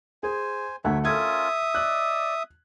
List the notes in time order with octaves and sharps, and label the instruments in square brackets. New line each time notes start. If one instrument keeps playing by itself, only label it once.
[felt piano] G#4 [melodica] C5 G#5
[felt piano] D2 A3 F#5 [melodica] F#3 C#5 E5
[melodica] C#4 F4 A#4 [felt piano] A4 G#6 [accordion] E5 D#6
[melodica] D5 D#5 E6 [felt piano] F#6